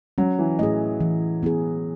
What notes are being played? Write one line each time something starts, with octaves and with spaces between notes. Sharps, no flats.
F#3 C#4
E3
A2 G#4 D#5
E3
B3 E4 G#4